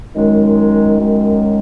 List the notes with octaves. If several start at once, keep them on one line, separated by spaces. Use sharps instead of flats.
F#2 D#3 G#3
F#2 D#3 G#3